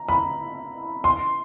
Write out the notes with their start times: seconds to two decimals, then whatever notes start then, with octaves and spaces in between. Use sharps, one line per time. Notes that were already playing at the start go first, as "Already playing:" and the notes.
Already playing: A#5
0.09 B5
1.04 C6